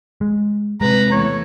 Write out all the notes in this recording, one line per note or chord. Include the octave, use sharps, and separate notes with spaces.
G#3
C3 G#3 B4 A#5
E2 A3 C#5